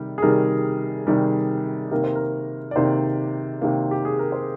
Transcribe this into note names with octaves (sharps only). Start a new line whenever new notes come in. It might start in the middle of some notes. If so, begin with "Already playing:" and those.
Already playing: C3 D#3 G3
G#4
C3 D#3 G3 A#4
C3 D#3 G3
C3 D#3 A#3 A#4
C5
A#4
D5
C3 D#3 A#3 C5
C3 D#3 A#3
G4
G#4
A#4
C5